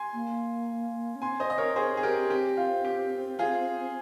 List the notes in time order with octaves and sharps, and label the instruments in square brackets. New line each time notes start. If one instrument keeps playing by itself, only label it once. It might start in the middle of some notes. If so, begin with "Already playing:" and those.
Already playing: [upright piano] G#5 C6
[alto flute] A#3
C#4
[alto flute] C4 [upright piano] G#5 C6
[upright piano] C5 D#5
D#5
A#4 C#5
G#4 C5
G#4
G4 A#4
[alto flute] C4 [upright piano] G4
[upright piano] F4
G4
F4 G#4